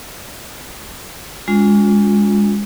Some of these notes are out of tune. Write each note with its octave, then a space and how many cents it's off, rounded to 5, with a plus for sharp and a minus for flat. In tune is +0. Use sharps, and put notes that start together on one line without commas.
G#3 -15 C#4 +40 F4 +20